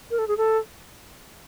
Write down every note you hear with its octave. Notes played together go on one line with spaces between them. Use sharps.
A#4
A4
G#4
A4